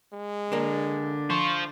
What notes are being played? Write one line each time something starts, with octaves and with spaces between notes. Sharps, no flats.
G#3
D3 A#3 D4
F4 C5 C#6